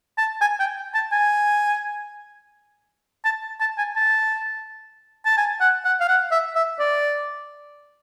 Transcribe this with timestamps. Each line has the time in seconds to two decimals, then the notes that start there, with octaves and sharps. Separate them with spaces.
0.18 A5
0.41 G#5
0.59 G5
0.95 A5
1.12 G#5
3.25 A5
3.60 A5
3.78 G#5
3.96 A5
5.25 A5
5.38 G#5
5.61 F#5
5.85 F#5
6.00 F5
6.08 F#5
6.31 E5
6.56 E5
6.79 D5